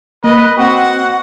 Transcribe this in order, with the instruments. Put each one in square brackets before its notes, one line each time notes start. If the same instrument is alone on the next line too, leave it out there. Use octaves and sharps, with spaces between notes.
[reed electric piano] A#3 [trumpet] B4 [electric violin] D#5
[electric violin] C4 [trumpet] F#4 [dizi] F#5 [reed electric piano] G5